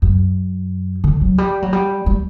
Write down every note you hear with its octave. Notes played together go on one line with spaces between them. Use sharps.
F#2
D3
F#3
G3
F#3
G3
G3